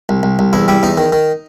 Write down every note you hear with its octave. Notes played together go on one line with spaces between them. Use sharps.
C2
C2
C2
E2 E4
G3 E4
E2 D#4
D#3
D#3